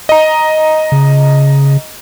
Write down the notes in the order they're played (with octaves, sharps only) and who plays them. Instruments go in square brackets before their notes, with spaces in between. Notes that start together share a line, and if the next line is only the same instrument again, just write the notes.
[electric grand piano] D#5 A#5
[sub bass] C#3